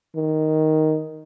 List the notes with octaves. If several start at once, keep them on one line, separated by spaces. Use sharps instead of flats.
D#3